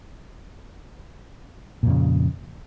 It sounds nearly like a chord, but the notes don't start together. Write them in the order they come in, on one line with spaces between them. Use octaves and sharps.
A#2 F2 C#3